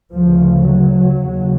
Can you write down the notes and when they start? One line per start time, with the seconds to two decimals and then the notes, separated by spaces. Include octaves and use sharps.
0.13 D2 C#3 F3
0.66 F#3
1.19 D#2 C#3